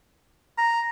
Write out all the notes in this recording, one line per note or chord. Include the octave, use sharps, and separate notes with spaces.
A#5